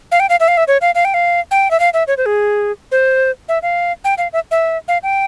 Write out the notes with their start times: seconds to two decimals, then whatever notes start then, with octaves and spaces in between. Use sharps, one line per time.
0.12 F5
0.20 G5
0.29 F5
0.40 E5
0.48 F5
0.57 E5
0.68 C#5
0.81 F5
0.95 F5
1.05 G5
1.14 F5
1.51 G5
1.71 E5
1.80 F5
1.94 E5
2.08 C#5
2.18 C5
2.26 G#4
2.92 C5
3.49 E5
3.63 F5
4.05 G5
4.18 F5
4.33 E5
4.51 E5
4.88 F5
5.03 G5